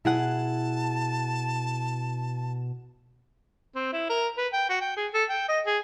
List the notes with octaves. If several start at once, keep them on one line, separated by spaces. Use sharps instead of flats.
B2 E4 G#4 F#5 A5
C4
E4
A#4
B4
G5
F#4
G5
G#4
A4
G5
D#5
G#4